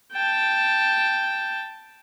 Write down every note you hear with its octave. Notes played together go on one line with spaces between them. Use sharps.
G5 A5